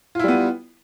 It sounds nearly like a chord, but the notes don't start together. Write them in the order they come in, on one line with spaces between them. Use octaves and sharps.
F4 E4 G3 B3